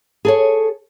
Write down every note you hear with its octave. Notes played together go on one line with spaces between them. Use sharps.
G#4 A4 C#5